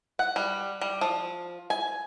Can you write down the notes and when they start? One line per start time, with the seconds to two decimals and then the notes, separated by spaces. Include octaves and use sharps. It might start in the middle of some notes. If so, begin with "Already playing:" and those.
0.19 F#5
0.36 G3
0.81 G3
1.01 F3
1.70 G#5